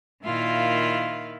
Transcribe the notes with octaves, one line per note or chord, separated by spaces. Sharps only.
A#2 D#3 E4 F4 F5